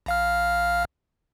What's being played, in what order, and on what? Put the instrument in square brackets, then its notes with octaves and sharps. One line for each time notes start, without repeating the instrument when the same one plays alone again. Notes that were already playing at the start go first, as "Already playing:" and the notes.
[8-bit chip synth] A#1 F5 F6